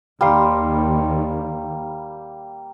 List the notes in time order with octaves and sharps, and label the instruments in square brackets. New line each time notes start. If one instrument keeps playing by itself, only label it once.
[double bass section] D#2 [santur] G3 A#3 C6